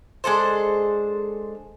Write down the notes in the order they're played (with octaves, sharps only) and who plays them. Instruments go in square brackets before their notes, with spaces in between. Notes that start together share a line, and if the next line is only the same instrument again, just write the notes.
[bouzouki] G#3 D4 A4 C5